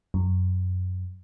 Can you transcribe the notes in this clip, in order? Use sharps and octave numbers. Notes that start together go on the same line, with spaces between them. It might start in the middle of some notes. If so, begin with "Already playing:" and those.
F#2